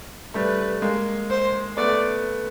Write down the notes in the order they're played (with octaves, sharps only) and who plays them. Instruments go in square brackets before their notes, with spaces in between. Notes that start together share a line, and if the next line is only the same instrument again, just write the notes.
[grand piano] G3 A3 [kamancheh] B4
[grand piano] G#3 A#3
[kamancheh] C5
[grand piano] A3 B3 [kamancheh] D5